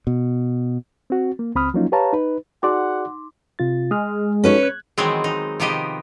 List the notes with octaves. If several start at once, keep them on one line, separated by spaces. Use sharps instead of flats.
B2
C4 F#4
A#3
C#2 C4 B5 D#6 F6
F3 F#3 A#3 C#4 D#4 F4
G4 B4 C#5 F5 A5 A#5
D#4 B4
D#4 F#4 G#4 D5 F#5 C6 D6
C3 F4 A6
G#3 D#6 F6
C#4 D#4 F#4 A4 B4 C#5
F#6 G#6
D#3 E3 F#3 G#3 B3 C4
D#4
C3 D#3 F3 B3 G4 D#5